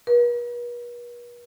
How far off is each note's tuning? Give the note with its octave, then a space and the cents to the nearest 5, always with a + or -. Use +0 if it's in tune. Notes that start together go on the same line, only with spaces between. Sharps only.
B4 -45